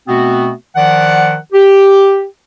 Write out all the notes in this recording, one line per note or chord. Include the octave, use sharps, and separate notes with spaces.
B2 A3 B3 C4 F#4
D#3 F3 D5 F#5
G4